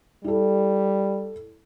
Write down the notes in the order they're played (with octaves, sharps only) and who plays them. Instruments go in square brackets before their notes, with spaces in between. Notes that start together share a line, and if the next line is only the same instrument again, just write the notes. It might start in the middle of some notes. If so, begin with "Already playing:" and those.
[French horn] G3 [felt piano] E4 A4